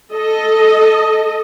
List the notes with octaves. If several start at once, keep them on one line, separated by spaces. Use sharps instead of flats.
A4 D#5